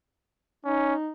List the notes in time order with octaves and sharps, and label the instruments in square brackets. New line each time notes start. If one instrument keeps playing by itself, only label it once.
[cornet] C#4 [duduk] D#4